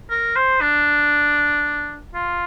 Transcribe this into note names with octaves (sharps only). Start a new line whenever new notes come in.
A#4
C5
D4
F4